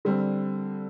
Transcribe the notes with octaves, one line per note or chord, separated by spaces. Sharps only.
D3 G3 C4